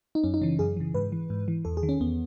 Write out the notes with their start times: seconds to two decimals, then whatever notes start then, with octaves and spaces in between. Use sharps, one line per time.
0.15 D#4
0.24 F#2 C#4
0.34 D#4
0.41 C#3 E3 C#4
0.59 F#2 G#4
0.77 C#3 E3
0.94 G#2 B4
1.12 E3
1.30 G#2
1.48 E3
1.65 E2 A4
1.77 G#4
1.83 D#3
1.89 C#4
2.01 E2 B3